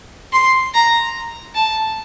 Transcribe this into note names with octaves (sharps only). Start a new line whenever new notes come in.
C6
A#5
A5